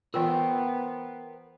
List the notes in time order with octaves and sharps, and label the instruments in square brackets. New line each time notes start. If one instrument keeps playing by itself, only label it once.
[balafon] E3 F4 [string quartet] B3 [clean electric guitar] A#4 C5 G5